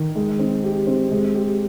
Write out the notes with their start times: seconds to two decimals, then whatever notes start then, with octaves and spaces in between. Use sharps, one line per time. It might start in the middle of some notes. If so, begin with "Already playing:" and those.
Already playing: D#3
0.16 G#3
0.39 C4
0.64 G4
0.87 C4
1.11 G#3
1.35 G4